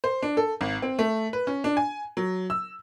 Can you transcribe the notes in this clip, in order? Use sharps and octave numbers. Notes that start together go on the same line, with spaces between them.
C5
D4
A4
G#1
C4
A3
B4
C#4
D4
G#5
F#3
E6